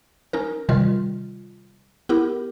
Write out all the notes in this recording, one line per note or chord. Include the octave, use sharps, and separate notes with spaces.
C#4 D#4 A#4
C3 D#3 G3 F4
B3 E4 G4 A#4